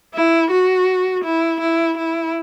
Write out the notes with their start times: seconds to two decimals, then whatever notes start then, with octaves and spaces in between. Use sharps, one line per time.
0.14 E4
0.51 F#4
1.24 E4
1.60 E4
1.97 E4